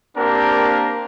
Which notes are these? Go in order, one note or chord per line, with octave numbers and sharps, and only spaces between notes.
A#3 C4 D4 G4 A#4